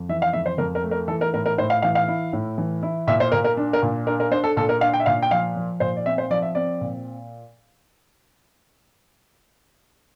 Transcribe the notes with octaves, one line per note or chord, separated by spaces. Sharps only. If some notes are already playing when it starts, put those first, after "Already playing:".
Already playing: F2
E3 E5
F5
F2 E5
C5
F2 A#4
A#4
A3
A#4
E3 A4
A#4
A2 A#4
A#4
A2 C5
F5
E3 F5
F5
E4
A2
E3
E4
A#2 E5
C5
A#2 A#4
A#4
D4
A#4
A#2
D4 A#4
A#4
D4 C5
A4
A#2 A4
A#4
D4 F5
G5
E5
A#2 F5
G5
F3 F5
F3
A#2 C5
D5
C4 E5
C5
F3 D5
E5
C4 D5
A#2